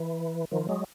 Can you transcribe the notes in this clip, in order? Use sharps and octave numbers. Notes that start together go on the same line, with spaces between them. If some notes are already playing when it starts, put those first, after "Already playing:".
Already playing: E3
D#3 F3
F#3 G#3